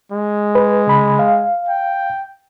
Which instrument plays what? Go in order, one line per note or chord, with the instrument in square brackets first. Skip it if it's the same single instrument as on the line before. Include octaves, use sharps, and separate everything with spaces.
[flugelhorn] G#3
[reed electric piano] B4
C#3 B5
F5
[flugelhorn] G5